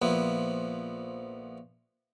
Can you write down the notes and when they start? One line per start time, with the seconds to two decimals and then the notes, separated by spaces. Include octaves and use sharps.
0.02 A#1 F3 B3 E4